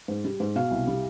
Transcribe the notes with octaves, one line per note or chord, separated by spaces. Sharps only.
G#2
G3
G#2
B2 F5
C2
G3